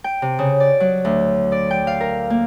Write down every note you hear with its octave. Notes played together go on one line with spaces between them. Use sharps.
G5
C3
C#3
D5
F#3
D2
D5
G5
F5
A#4
A#3